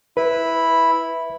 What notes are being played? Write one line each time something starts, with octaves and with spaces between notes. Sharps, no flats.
E4 B4 B5